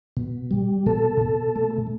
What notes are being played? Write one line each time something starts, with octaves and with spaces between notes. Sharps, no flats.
B2
G3
B2 A4
B2
A3